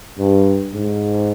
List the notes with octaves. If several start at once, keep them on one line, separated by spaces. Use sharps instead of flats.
G2
G#2